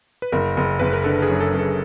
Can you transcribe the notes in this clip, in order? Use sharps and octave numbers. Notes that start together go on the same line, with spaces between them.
B4
F#1 A#4
F#1
F#1 B4
A#4
D3 A4
G#4
F#2
A4
F#2
A4